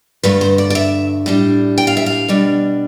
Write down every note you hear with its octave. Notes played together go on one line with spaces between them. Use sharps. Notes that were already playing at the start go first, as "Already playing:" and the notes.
G2 D3 A3 B4
C5
D5
D5
E5
A2 G3 D4
G5
F5
E5
F5
B2 G3 D4